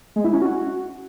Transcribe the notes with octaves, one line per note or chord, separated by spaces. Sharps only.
G#3
E4
C#4
F#4